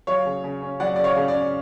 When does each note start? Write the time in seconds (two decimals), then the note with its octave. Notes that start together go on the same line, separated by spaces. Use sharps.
0.07 F#3 C#5 F5
0.26 C#3
0.44 C#3
0.62 C#4
0.80 F#3 D5 F#5
0.96 C#3 D5
1.04 C#5 F5
1.16 C#3
1.28 D5
1.35 C#4